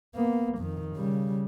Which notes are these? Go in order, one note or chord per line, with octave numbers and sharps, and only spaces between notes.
A#3 B3
F2 D#3
C#3 G3